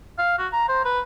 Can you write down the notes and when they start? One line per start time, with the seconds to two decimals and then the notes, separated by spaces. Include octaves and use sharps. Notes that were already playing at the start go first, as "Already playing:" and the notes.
0.18 F5
0.38 F#4
0.53 A#5
0.69 C5
0.85 B4